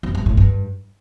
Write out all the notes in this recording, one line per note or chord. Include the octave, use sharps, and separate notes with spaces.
F2
G2
A2
G2